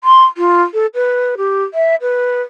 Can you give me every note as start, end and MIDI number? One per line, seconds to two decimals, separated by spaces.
0.04 0.25 84
0.37 0.62 65
0.74 0.86 69
0.95 1.35 71
1.37 1.64 67
1.74 1.95 76
2.01 2.42 71